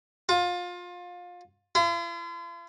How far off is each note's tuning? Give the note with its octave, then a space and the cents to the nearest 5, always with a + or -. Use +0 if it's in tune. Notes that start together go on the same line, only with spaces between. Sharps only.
F4 +25
F4 -45